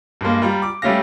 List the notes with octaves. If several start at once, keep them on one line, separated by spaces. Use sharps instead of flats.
G2 G#3 A#3
G3 F4 A#5
D6
G3 A3 C#4 G4 F5 A#6